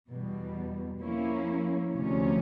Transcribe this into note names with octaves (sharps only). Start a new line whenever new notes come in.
E2 B2 G3
F3 A#3 C#4 E4
D2 C3 F3 A3 C#4